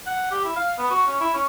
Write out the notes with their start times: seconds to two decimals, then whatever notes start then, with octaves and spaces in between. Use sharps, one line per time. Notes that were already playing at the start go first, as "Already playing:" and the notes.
0.07 F#5
0.31 G4
0.45 E4
0.56 F5
0.78 B3
0.90 F#4
1.07 C#4
1.20 E4
1.34 C#4